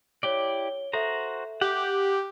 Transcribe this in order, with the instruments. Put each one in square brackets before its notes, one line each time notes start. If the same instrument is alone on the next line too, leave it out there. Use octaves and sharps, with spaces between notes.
[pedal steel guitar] E4 G4 D5 [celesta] C#5 G7
[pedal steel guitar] F#4 C5 A#5 [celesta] A4 E5
[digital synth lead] G4 [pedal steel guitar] F#5 D6